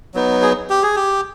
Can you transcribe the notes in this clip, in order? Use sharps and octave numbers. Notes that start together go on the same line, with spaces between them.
F#3 B3 D#4
G#4
G4
G#4
G4